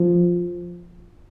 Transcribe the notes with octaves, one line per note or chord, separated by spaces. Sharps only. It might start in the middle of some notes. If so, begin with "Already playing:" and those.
Already playing: F3